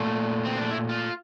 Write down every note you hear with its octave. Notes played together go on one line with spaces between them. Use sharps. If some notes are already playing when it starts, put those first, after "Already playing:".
Already playing: A#2 A3
C4
D4
E4
F4